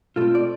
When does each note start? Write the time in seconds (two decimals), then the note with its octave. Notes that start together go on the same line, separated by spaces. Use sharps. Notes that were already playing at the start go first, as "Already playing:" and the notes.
0.16 B2 A3 C4 F4 A4
0.35 D5